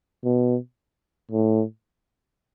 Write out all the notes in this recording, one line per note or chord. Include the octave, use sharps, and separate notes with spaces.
B2
A2